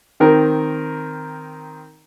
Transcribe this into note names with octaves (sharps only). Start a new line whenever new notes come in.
D#3 C4 A#4